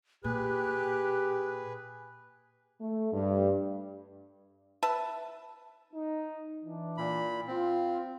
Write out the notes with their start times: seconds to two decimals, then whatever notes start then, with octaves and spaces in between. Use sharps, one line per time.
0.24 A#2 G4 G#4 B4 F#6
2.81 A3
3.13 G2
4.83 B4 E5 A5
5.93 D#4
6.64 E3 D4
6.97 A#2 B5
7.47 C4 F4